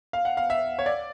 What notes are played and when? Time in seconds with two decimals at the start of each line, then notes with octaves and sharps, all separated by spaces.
0.13 F5
0.25 F#5
0.37 F5
0.50 E5
0.79 C#5
0.86 D5